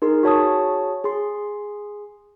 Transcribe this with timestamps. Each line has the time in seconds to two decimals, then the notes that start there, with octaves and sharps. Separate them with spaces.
0.02 D#4 G#4 A#4 C6
0.23 F#4 G#4 C#5 A5 C#6 D#6
1.04 G#4 C6